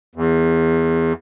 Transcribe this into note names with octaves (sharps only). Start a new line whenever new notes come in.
E2